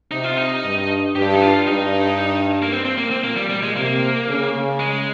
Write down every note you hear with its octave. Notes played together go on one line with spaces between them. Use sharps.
C3 D#4
F4
D#4
G2
G2 G4
D#4
F4
G2 D#4
A#3
C4
C4
A#3
C4
A#2 A#3
G3
G3
G#3
C3 A#3
C#3
G#3